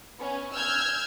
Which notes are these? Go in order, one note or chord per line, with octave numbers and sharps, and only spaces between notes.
B3 C#4
E6 F6 G6 G#6